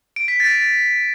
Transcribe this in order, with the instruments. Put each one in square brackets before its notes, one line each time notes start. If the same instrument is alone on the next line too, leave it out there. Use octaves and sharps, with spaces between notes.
[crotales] D7
B6
A6